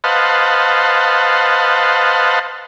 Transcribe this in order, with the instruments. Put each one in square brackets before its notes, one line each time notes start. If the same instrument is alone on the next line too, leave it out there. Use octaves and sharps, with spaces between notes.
[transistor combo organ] B4 C5 D#5 F5 F#5 A5